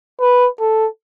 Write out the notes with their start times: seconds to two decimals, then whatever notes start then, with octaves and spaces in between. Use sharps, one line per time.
0.21 B4
0.60 A4